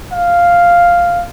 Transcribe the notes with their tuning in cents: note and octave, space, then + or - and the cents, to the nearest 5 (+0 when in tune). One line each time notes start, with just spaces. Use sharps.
F5 +0